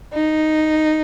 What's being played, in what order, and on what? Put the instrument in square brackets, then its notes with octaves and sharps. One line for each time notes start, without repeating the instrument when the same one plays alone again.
[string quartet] D#4